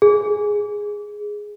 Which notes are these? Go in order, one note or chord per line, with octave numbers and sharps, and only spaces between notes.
G#4